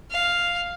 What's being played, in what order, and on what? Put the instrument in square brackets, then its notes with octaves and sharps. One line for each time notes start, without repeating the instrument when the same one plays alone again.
[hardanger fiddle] F5